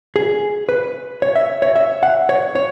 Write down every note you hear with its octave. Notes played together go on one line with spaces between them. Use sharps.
G#4
B4
C#5
E5
C#5
E5
F#5
C#5
C#5